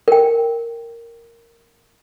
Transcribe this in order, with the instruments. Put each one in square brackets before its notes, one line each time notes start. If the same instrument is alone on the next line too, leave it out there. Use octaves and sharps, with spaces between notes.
[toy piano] A#4 G5